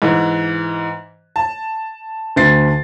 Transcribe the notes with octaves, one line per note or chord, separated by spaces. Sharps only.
G#2 E3
A5
D2 A6 C7